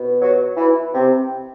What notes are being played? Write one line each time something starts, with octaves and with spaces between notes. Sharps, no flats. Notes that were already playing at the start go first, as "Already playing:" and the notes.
Already playing: B2
F#3 F#4
E3 E4
C3 C4